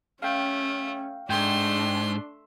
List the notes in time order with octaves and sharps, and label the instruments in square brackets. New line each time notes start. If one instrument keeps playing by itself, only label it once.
[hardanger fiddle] A3 [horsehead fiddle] C#4 [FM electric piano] F5 G5
[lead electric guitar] G#2 [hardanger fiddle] A3 C6 [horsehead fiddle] D4 [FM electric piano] G5